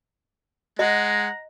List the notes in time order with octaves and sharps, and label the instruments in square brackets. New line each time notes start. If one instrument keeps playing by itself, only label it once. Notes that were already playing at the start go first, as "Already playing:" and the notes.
[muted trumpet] G#3 [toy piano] D#5 [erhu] F#5 [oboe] A#5